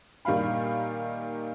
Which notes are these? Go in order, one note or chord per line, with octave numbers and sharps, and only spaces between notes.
A#2 D#3 G3 F5 B5